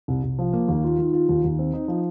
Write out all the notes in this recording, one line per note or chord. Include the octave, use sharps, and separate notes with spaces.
C2
C2
F3
A#3
D#2
F4
D#3
F4
D#2
D#2
C4
D#4
F3